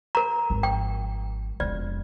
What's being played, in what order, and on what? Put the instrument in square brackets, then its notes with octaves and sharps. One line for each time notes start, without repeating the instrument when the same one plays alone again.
[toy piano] A#4 A#5
[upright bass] G#1 F3
[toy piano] G5
[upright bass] E1 F2 [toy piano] D5